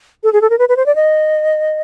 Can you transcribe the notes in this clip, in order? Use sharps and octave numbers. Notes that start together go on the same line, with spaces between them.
A4
G#4
A4
A#4
B4
B4
C5
D5
D#5